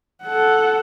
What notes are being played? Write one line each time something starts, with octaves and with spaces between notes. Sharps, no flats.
A4 F#5